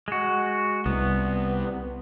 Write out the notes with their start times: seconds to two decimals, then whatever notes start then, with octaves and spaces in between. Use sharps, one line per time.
0.08 G#3 F#4
0.86 C2 B3